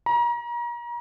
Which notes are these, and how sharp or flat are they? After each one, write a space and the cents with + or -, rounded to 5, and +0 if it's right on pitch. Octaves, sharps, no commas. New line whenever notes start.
A#5 +35